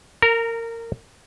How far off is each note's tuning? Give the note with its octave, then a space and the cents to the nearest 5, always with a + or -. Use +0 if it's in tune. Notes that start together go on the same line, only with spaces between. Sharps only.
A#4 -20 A#5 +0